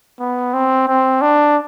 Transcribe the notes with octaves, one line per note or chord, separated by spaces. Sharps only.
B3
C4
C4
D4